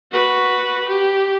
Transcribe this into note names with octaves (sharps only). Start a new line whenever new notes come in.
F#4 B4
G4